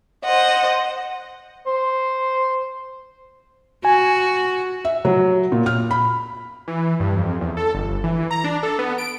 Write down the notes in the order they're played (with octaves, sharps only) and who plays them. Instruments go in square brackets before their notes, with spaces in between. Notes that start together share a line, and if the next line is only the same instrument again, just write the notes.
[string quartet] C5 D#5 F#5
[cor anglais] C5
[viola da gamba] F#4 [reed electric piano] G#5
[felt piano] E5
F#3
A#2
F6
B5
[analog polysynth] E3
G2
F2
E2
A4
G1
E3
A#5
D4
A4
B3
D7